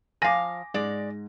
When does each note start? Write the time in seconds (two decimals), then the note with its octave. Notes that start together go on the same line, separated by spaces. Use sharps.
0.22 F3 F5 G#5 D6 A#6
0.74 G#2 G#3 D5